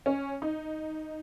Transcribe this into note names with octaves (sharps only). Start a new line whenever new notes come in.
C#4
D#4